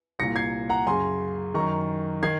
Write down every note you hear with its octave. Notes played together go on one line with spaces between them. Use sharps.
C2 A#2 A#6 C#7
G#6 C7
F#5 A#5
F#2 C#3 G#5 C6
F#2 D#3 A#5 C#6
D#3 G#6 C7